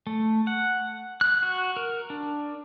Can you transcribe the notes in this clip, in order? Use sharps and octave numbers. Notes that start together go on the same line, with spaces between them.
A3
F#5
F#6
F#4
A#4
D4